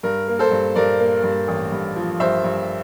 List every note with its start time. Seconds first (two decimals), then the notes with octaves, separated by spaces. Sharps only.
0.03 G2 A#4
0.28 A#3
0.39 A4 C5
0.51 G2
0.76 G2 A#4 D5
1.00 A#3
1.23 G2
1.48 A1
1.72 G2
1.96 F3
2.20 G2 C5 E5
2.44 G2